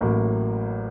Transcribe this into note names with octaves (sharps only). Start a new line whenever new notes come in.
A1 A2 F#3 A#3